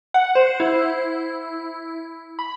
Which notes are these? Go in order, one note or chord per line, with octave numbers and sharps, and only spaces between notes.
F#5
C5
E4
B5